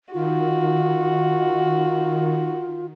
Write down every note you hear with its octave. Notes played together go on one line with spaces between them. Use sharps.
D#3 F4 F#4